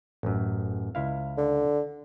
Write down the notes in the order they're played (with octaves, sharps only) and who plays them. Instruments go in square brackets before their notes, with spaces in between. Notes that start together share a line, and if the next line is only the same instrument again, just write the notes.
[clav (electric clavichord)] A1 F#2
C#2 E4 F5
[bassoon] D3